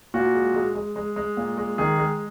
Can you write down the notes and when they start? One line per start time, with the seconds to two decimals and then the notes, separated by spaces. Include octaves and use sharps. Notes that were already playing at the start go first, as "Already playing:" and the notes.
0.14 A#2 F#4
0.34 G#3
0.54 G#3
0.75 G#3
0.96 G#3
1.16 G#3
1.37 A#2
1.57 G#3
1.78 D#3 G#4
1.98 G#3